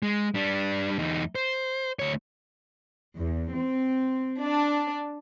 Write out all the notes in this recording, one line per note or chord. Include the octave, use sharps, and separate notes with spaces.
G#3
G3 D4
E2 D#4
C5
D2 C#5
E2
C4
D4